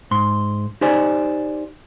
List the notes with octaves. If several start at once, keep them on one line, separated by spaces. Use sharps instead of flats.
G#2 C6
D#4 G4 C5 D5 G#5